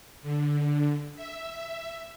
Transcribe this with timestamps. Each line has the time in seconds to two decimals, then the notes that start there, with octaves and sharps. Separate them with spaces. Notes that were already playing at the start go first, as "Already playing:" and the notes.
0.22 D3
1.16 E5